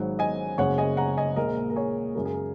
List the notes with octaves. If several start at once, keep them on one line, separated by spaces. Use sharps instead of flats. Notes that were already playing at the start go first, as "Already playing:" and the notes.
Already playing: G#1 G#2 F#3
D#5 G#5
F#1 F#2 C#3 G#3 C#5 F#5
D#5 G#5
F#5 A#5
D#5 G#5
A#1 A#2 G#3 A#4 D#5
A#4
G#4 C#5
F#2 C#3 G#3 A#4
G#4
A#4